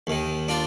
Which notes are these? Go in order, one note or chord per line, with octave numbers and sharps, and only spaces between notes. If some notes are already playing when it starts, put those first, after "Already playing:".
D#2 D#3
D4 F4